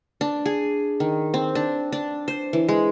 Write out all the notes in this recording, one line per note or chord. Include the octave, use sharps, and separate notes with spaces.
D4
G#4
D#3
C4
D4
D4
C5
E3
G#3